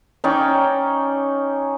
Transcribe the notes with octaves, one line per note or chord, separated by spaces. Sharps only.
C#4 D#4 D5 G5